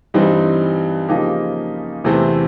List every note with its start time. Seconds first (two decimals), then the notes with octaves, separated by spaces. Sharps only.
0.14 G2 E3 G3 C4 D#4
1.09 C#3 F3 A#3 D#4 G4
2.04 E2 C3 E3 A3 C4